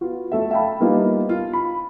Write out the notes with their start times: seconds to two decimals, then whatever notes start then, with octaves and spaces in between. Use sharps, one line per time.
0.01 B3 F4 F#4
0.32 A3 A4 E5
0.51 E5 F5 G5 A5 B5
0.80 G3 A#3 B3 D#4 F4
1.29 F4
1.53 B5